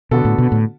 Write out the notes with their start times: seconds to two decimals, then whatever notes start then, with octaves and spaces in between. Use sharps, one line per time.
0.11 B2 D3 B3 F#4 A4
0.25 A2
0.38 B2
0.52 A2